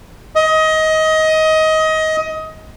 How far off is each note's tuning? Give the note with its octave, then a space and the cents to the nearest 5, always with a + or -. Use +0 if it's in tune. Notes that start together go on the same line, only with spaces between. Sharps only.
D#5 +20